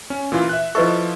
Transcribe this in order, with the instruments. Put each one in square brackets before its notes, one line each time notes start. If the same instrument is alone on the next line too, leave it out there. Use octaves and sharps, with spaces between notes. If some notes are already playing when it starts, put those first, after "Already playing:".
[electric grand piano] C#4
A#2 E3 F4
E5 F#6
[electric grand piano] F3 E4 A4 [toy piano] B4 D#5 C#6